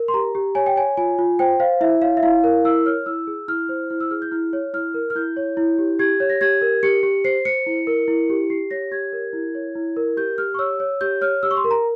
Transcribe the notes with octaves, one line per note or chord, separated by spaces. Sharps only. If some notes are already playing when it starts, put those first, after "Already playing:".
Already playing: A#4
C6
G4 A#5
G4
C#5 G#5
G5
C#5 G#5
F4 G#5
F4
C5 G5
C5 F5
E4 E5
C#5 F5
E5
E4 F5
A#4
E4 E6
C#5 F6
E4 E6
G#4
E4 F6
C5
E4 F6
E6
G#4 F6
G6
E4 F6
C#5
E4 F6
A#4
F6
E4 G6
C#5
E4
G4
G4 G#6
C#5
A#6
G4 G#6
A#4
G4 C#7
G4
C5 C7
C5 C#7
E4
A#4
E4
G4
G4 C7
C#5 A#6
G4 G#6
A#4
E4
C#5
E4
A#4
G4 G6
G4 F6
C#6
C#5 E6
C#5
G4 G6
C#5 F6
G4 E6
C#6
C6
A#4
A#5